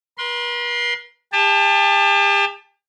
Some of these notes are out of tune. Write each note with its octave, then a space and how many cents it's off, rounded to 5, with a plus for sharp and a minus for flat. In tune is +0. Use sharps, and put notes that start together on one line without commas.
B4 -45 C6 +0
G4 +40 A5 +0